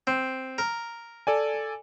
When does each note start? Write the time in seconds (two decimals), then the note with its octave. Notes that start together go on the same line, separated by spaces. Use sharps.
0.07 C4
0.58 A#4
1.27 A4 D5 G#5